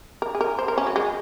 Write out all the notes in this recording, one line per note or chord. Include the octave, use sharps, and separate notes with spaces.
A#4
G#4
A#4
C5
A#4
C#4
F#3
G#3